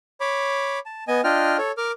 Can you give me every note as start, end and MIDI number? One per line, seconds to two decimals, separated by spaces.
0.20 0.79 73
0.20 0.79 83
0.20 0.79 86
0.86 1.04 81
1.08 1.21 59
1.08 1.21 75
1.08 1.21 80
1.24 1.57 62
1.24 1.57 65
1.24 1.57 75
1.24 1.57 79
1.24 1.57 89
1.58 1.72 69
1.58 1.72 73
1.77 1.92 70
1.77 1.92 86
1.77 1.92 89